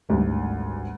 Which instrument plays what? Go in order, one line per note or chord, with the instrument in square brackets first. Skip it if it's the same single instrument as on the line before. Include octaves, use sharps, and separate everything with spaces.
[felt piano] G#1 D2 G2